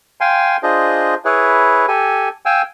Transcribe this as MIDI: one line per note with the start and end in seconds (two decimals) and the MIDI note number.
0.21 0.57 77
0.21 0.57 79
0.21 0.57 80
0.21 0.57 84
0.63 1.15 62
0.63 1.15 65
0.63 1.15 68
0.63 1.15 72
0.63 1.15 75
1.25 1.86 64
1.25 1.86 68
1.25 1.86 71
1.25 1.86 73
1.88 2.29 67
1.88 2.29 69
1.88 2.29 80
2.46 2.62 77
2.46 2.62 79
2.46 2.62 80
2.46 2.62 88